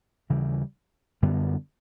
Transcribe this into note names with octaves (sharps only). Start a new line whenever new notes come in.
D#2 C#3 E3 G3
F#2 D3 G3 B3